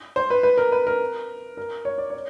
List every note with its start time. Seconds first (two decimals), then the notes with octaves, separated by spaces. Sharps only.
0.16 C5
0.30 B4
0.43 B4
0.58 A#4
0.72 B4
0.87 A#4
1.57 A#4
1.85 C#5
1.98 D5
2.10 C#5